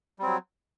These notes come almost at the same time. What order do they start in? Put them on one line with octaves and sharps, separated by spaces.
G3 C4 F#3